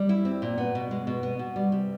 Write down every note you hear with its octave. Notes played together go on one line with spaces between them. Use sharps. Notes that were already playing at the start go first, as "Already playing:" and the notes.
Already playing: G3
E4
C4
A#2
B3
B2
G#3
B2
B3
B2
G3
C3